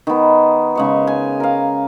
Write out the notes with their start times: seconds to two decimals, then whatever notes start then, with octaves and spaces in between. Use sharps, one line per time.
0.07 D#3 B3
0.75 C#3 G#3 C#6
1.07 G#5
1.40 A#4 F5